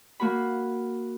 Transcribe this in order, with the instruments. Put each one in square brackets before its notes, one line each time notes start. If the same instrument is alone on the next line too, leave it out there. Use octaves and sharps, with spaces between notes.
[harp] A#3 F#4 B5